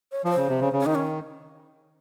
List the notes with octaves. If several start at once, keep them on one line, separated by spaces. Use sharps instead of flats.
C#5
F3 C#5
C5
C#3
C3
C#3
C#3
C#4
D#3 D#4
C#4